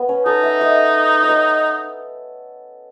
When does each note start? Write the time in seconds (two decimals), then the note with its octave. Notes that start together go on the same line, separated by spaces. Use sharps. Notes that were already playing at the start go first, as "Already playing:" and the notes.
Already playing: B3
0.09 C#4
0.26 D#4 A4
0.43 E5
0.61 D#5
1.23 C#5
1.29 D#5